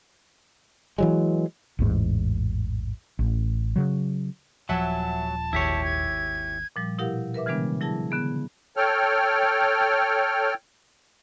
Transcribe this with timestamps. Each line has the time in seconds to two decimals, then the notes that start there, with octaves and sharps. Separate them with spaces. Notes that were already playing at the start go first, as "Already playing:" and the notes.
0.98 E3 F#3 G#3
1.79 A1 E2 G#2
3.19 A1
3.76 C#3 F#3
4.69 D#1 F3 F#3 E5 F#5 G#5 A5
5.53 G#1 D#2 E4 G4 C#5
5.84 G#6
6.76 A#2 F3 G3
6.98 B2 E4 G4 A#4 F5 F#5
7.34 A#4 B4 E5 D6
7.46 C#3 E3 G3 G#3 B3 D4
7.81 F#3 E4 G#4 A5 A#6
8.11 D3 B3 G#4
8.77 A4 C#5 G5 F6